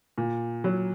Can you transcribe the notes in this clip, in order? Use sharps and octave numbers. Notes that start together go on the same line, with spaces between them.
A#2
F#3